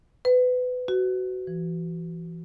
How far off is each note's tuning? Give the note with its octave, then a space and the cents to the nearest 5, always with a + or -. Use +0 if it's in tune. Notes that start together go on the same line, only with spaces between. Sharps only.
B4 +25
F#4 +15
E3 +30